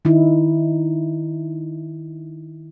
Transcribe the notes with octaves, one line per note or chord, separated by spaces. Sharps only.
D#3 D#4 E4